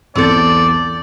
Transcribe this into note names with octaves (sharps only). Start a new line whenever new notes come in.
B1 E2 C4 A4 D5 G6